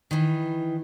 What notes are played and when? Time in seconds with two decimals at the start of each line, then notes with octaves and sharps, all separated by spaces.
0.11 D#3 E3